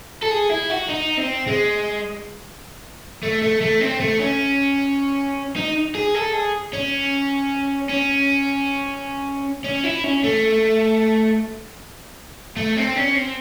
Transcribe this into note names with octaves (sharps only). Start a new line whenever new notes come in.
A4
G#4
E4
F#4
D#4
C4
G#3
A3
A3
A3
C4
A3
C#4
D#4
G#4
A4
G#4
C#4
C#4
C#4
E4
C#4
A3
A3
C4
C#4
C4